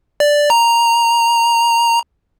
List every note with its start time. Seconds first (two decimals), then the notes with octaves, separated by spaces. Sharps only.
0.20 D5
0.50 A#5